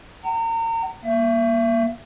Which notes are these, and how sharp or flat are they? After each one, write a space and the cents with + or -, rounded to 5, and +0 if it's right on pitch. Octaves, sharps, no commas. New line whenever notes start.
F#5 +45 A#5 -35
A#3 +20 E5 +30